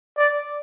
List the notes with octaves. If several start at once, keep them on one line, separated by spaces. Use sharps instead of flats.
D5